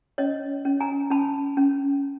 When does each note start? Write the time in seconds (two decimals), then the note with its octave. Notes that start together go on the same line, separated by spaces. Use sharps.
0.18 C#4 C#5 D#5
0.65 C#4
0.80 G#5 A#5
1.10 C#4 A5 B5
1.57 C#4